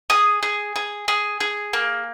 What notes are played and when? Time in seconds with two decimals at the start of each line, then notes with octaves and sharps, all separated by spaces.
0.10 G#4 D#6
0.43 G#4
0.76 G#4
1.08 G#4
1.40 G#4
1.73 A#3